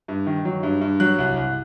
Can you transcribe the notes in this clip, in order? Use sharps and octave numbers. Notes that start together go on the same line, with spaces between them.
G2
D#3
F#3
G2
G2
F#3 F#6
C2
C2